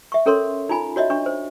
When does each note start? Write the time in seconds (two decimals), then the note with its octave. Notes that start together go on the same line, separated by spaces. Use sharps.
0.12 E5 C#6
0.26 C#4 A4 A#4 C#5 C6
0.69 D#4 F4 G#5 B5
0.96 F#4 C#5 D#5 E5
1.10 D4 C#6
1.26 C5